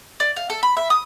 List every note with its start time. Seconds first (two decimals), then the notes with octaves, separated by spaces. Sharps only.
0.20 D5
0.36 F5
0.50 A4
0.63 B5
0.77 E5
0.90 D#6